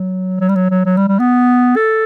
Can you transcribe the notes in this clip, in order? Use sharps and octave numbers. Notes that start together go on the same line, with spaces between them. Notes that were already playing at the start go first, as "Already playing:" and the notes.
Already playing: F#3
F#3
G3
F#3
F#3
F#3
G3
G3
B3
A4